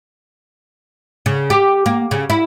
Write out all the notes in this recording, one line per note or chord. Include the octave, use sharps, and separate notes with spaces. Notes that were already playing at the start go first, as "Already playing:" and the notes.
C#3
G4
A#3
C#3
E4